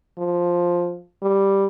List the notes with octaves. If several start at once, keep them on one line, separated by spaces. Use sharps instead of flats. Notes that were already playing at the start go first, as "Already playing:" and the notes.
F3
G3